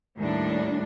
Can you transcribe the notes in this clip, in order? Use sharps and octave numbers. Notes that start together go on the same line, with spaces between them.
D#2 A2 G3 D4